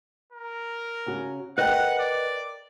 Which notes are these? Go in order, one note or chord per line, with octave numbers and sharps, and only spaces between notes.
A#4
C#3 C#4 F#4
A#4 B4 D#5 F#5 G5
D5